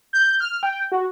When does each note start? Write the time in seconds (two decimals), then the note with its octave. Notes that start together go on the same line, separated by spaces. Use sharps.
0.13 G6
0.40 F6
0.63 G5
0.92 F#4